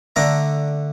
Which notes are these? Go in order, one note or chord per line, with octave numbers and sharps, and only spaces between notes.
D3 A3 D4 A#5 D6